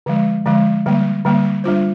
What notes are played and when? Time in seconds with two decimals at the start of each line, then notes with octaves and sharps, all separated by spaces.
0.06 D3 F3 G#3
0.45 D3 F3 G#3
0.86 D3 G3 A#3
1.25 D3 G3 A#3
1.64 G3 D4 F4 C5